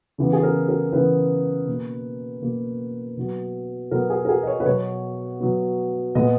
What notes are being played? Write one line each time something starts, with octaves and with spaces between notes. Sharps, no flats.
C#3 E3 B3
G#4
A#4
A#4
C#3 E3 B3 B4
B2 A#3
B2 A#3
B2 F#3 B3
B2 F#3 B3 A#4
G#4
A#4
G#4
D#5
C#5
B4
B2 F#3 B3 C#5
B2 F#3 B3
A#2 G#3 B3 D#5